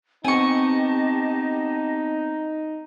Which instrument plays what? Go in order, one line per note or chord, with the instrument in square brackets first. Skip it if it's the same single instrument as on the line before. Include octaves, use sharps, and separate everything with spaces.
[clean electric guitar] B3 C4 [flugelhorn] D#4 [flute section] G4 D#5 A5 [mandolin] G#5 C#6